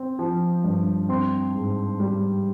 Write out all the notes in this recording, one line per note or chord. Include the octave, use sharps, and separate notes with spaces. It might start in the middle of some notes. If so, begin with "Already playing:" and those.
Already playing: C4
F3
G2
C4 C6
G#2
G3